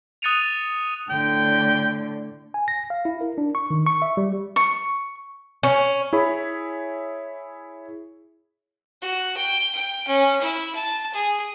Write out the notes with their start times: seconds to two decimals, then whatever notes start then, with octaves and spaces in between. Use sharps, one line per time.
0.22 D#6 F#6 A6 C#7 D#7 F7
1.10 A2 D3 G5
2.54 G#5
2.68 A#6
2.90 F5
3.05 E4
3.21 A#4
3.38 D4
3.55 C#6
3.71 D#3
3.86 C#6
4.02 E5
4.17 G3
4.56 C#6
5.63 C#4
6.13 E4 G#4 C#5 B5
9.02 F#4
9.37 G5
9.75 G5
10.08 C#4
10.41 E4
10.75 A5
11.13 G#4